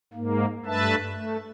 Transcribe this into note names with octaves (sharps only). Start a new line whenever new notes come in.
G#2 A#3
G2 A3 B4 E5 A5
A3